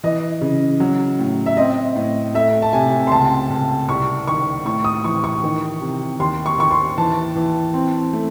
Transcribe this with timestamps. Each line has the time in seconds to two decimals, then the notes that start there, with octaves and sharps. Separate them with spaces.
0.04 E3 D#5
0.41 C#3
0.80 F#3
1.19 A2
1.46 E5
1.57 C4 D#5
1.96 A2
2.34 A3 E5
2.62 A5
2.73 C3 G#5
3.07 C6
3.12 C#2 A5
3.50 C#2
3.88 C2 C#6
4.27 D#3 C#6
4.65 A2 C#6
4.84 D#6
5.04 E3 C#6
5.24 C#6
5.43 D#3
5.81 C3
6.19 D#2 C6
6.46 C#6
6.58 D#2 C#6
6.71 C6
6.98 E3 A5
7.35 E3
7.74 C4
8.13 A3